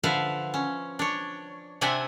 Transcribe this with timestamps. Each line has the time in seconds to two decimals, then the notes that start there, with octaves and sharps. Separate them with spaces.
0.03 D3 F3 B4 E5 F5
0.54 C#4
0.99 D4 C#5
1.81 C3 C4 D4 E5 F#5 G#5